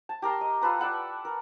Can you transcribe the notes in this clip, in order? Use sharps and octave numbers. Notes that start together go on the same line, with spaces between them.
A5
G4 A#4 A#5 C6
D#5
F4 A4 B4 A#5
D5 E5 F#5 A5
A#4